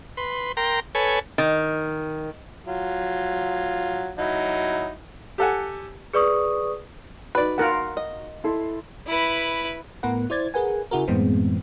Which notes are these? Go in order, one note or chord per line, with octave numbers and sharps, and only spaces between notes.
B4 C6
A#4 G5 A#5 C6
A4 B4 C#5 G#5
D#3
F#3 F4
F#3 D#4 E4
G4 A4 F#5 G#5
G#4 B4 D5 C#6 D#6
D#4 F#4 B4 D5
F4 A#4 F#5
D#5
E4 A4 C6
E4 B4
A2 B3 A#4 B4 F#5
E4 C5 D5 G#6 A6
G#4 A#4 B4 F#5 G#5
C#3 E4 F#4 G#4 A#4
F#2 A2 E3 G#3 B3 C4